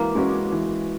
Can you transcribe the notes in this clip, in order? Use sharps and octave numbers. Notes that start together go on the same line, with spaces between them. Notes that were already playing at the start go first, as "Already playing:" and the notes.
Already playing: E3 G#3 A#3 F#4
G#3 C#4 F#4 B4
E3